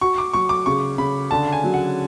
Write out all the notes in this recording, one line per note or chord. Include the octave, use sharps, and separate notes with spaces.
F#4 C#6
D6
F#3 C#6
D6
C#3 C#6
C#3 B5
D3 A5
G#5
F#3
F#5